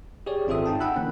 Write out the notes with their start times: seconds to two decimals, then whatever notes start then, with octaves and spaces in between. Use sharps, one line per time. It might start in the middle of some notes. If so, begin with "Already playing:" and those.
0.26 G4 G#4 C#5 D5
0.47 G#1 C4 F4 A4 E5 D#6
0.66 G#2 D#4 G5 A5
0.80 F#5 G5 B5 E6 F#6
0.96 D3 E3 A#3 C#4